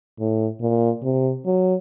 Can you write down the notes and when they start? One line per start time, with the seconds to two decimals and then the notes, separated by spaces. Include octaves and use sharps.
0.19 A2
0.61 A#2
1.03 C3
1.45 F#3